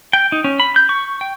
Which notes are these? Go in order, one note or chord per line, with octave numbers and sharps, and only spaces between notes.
G5
D#4
C#4
B5
G6
C#6
G5